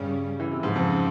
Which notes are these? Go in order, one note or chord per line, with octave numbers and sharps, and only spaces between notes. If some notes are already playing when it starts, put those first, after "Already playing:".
Already playing: G2 C#3 G3 C#4
E3
C3
G#2 C#3 F3 C4
F2